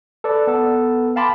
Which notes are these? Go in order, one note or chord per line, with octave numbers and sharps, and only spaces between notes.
A4 B4 D5
B3 A4
F5 G5 A5 B5 C6 D6